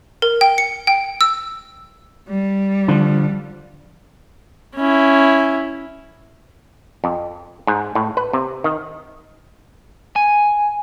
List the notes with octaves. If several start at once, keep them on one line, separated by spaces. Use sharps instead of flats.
A#4
G5
C#7
G5
E6
G3
D3 F3
C#4 E4
F2
G#2
A2
B4
C3
D#3
G#5